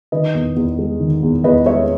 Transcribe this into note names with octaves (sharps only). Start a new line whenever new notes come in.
D#3 B4 D#5
E2
E2
G#3
D#3
E2
E2 B4 D#5
G#3 C#5 E5